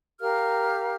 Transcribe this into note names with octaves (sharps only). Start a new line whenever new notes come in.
G4 A#4 F5 F6